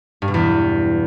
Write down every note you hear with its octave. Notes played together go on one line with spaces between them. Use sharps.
G2
B2
E2